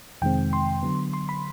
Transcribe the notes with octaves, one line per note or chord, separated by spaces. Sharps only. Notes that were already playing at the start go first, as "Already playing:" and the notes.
F2 C3 D#3 G#3 C4 G5
C6
D3 F#3 B3
C6
B5